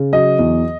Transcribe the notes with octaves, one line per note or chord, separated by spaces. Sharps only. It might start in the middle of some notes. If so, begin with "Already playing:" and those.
Already playing: C#3
F#3 D#5
E2